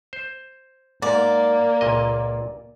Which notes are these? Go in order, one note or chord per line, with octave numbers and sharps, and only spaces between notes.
C5
G#2 A#3 D5
C#2 A#2 D#5